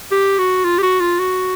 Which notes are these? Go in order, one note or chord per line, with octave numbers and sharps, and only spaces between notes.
G4
F#4
F4
G4
F#4
F4
F#4